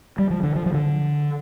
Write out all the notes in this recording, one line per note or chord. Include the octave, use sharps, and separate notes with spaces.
G3
F3
D3
F3
F3
D3